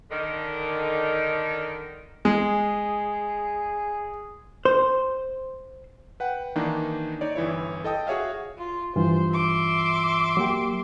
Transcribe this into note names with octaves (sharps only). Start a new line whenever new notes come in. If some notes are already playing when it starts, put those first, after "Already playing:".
D3 D#3
G#3 G#4
C5
B4 F#5 G5
D#3 E3 A#3 D4 D#4
D#4 C#5 D5
G1 E3 E4 C#5
A4 D#5 G5 D#6
F#4 G#4 C#5 E5 F5
F4
G2 E3 F4 C5
E5 C6 D6
F#3 A#3 G4